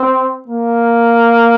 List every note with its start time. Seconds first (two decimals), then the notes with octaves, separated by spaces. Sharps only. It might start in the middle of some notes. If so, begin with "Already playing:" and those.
Already playing: C4
0.48 A#3